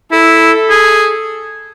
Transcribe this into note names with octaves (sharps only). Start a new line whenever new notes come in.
E4 A4
G#4